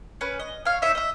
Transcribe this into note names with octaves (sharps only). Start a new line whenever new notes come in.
C#4 B4
D#5
C#5 F5
D#4 E4 C#5 E5
D#5 E5